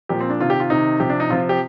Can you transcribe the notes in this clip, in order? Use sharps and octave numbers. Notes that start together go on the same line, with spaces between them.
A#2 F3 G4
C4
D4
C3 D#3 F4
G4
F4
C3 D#3 D#4
C3 F3 G4
D4
D#4
C3 F3 F4
G4